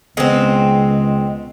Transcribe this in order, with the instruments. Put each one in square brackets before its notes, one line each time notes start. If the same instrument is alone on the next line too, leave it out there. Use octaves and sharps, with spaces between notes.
[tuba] C#2 [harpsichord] B2 [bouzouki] G#3 C4